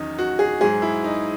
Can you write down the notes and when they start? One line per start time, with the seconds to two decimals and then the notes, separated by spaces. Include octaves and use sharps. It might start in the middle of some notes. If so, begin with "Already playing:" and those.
Already playing: E2 D#3 F#3 C#4 D#4
0.19 F#4
0.39 G#4
0.61 G#2 F#3 G#4
0.82 E4
1.04 D#4